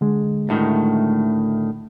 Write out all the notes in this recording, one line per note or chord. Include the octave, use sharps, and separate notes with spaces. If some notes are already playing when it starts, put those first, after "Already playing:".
D3 G#3
D2 A2 D#3